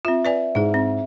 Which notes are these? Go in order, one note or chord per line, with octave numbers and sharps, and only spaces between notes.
C4 F4 E5
B4 D5 G#5
G#2 E4 G#4
C4